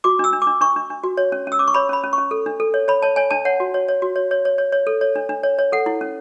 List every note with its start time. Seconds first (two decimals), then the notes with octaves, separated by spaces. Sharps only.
0.04 F#4 D6
0.19 D4 E6
0.33 D4
0.42 D6
0.47 D4
0.61 D4 C#6
0.76 D4
0.90 D4
1.04 F#4
1.17 C#5
1.32 C#4
1.47 C#4
1.52 E6
1.59 C#4 D6
1.68 C#6
1.74 C#5 B5
1.89 C#4 B5
2.04 C#4
2.13 C#6
2.18 C#4
2.31 A4
2.46 D4
2.60 A4
2.74 C#5
2.88 C#5 B5
3.02 C#5 A5
3.16 C#5 G#5
3.30 D4 A5
3.45 C#5 F#5
3.60 F#4
3.74 C#5
3.88 C#5
4.02 F#4
4.16 C#5
4.31 C#5
4.45 C#5
4.58 C#5
4.72 C#5
4.87 A4
5.01 C#5
5.16 D4
5.29 D4
5.43 C#5
5.59 C#5
5.72 A4 F#5
5.86 E4
6.01 C#4